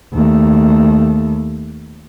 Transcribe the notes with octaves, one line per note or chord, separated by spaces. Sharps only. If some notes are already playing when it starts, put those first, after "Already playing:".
D#2 A3